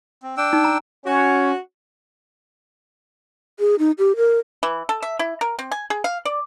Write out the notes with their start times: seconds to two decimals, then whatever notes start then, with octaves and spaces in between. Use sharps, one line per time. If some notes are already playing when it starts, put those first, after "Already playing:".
0.23 C4
0.37 D4 G5 E6
0.53 D#4
0.64 A#5
1.06 C#4 F#4 C#5
3.59 G#4
3.79 D#4
3.98 G4
4.16 A#4
4.63 E3
4.89 A4
5.02 E5
5.19 E4
5.41 A#4
5.59 C4
5.71 G#5
5.90 G#4
6.04 F5
6.25 D5